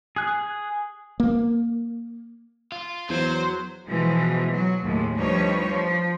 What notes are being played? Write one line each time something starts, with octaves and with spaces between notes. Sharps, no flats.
G#4 F#6
A#3
F4
E2 F#3 C5
B2 E3 F3 G#3
F#3
D#2 A2 G#3
D2 F3 G3 D#4 B4 C#5
F3